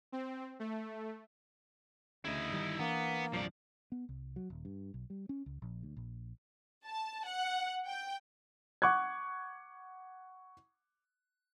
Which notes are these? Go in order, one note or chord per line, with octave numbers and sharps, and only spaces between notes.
C4
A3
D2 C#3 E4 D#5
G1 D#3 G3
E3 A#3 B3 D4
E1 C2 G2 F3 D5
B3
C2
F#3
D#1
G2
B1
G3
C#4
C#2
A#1
D2
A#1
A5
F#5
G5
F#5 C#6 D6 F#6 G#6